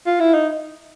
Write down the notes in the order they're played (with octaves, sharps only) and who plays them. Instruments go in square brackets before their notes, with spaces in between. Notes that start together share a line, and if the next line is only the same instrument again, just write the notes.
[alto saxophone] F4
E4
D#4